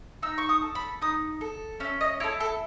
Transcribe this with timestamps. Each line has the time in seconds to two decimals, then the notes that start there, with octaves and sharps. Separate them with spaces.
0.22 D#4 E6
0.38 C#6
0.49 D#6
0.62 A4
0.75 B5
1.02 D#4 D#6
1.41 A4
1.80 C#4 E5
2.01 D#5
2.20 E4 A4 C#5
2.40 A4